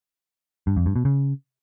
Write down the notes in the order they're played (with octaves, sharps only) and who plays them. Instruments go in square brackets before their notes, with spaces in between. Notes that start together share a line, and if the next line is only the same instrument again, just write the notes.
[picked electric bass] G2
F2
G2
B2
C#3